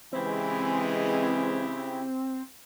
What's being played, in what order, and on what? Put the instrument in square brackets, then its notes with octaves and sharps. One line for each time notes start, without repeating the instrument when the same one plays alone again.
[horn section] C#3 E4 G4 [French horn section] E3 G#3 [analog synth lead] C4